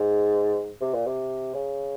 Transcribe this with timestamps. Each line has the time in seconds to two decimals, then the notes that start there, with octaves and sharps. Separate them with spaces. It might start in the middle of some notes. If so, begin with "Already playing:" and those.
Already playing: G#2
0.81 C3
0.94 A#2
1.06 C3
1.54 C#3